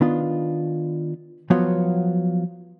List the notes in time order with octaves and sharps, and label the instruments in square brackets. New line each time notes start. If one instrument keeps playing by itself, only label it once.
[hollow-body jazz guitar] D#3 B3 D4 F4
F3 F#3 B3 F4 F#4 C#5